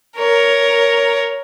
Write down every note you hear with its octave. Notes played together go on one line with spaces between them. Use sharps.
A#4 C#5